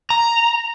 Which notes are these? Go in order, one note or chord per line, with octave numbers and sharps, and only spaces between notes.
A#5